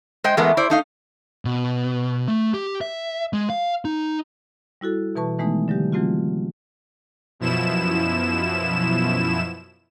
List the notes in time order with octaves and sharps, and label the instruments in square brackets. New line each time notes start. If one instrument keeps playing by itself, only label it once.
[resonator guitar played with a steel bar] G#3 C5 D#5 G5
E3 G#3 A3 B3 A#4
E4 C5 D5
A3 D#4 F5
[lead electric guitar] B2
A3
G4
E5
G#3
F5
D#4
[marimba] G3 E4 F#4 A4
B2 E3 B4 A5 C#6
D#3 E3 G#3 A3 B3 D#4
D3 F#3 G3 G4
E3 F#3 A3 C4 F4 F#4
[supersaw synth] F#2 B2 F3 E4 E7